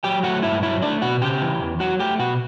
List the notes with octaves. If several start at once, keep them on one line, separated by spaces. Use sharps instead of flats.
F#3 G4 G5
A3 F#4 F#5
G2 E4 E5
F#3 E4 E5
A3 D4 D5
B2 F#4 F#5
C#3 G4 G5
E3
E2
F#3 F#4 F#5
A3 G4 G5
B2 F#4 F#5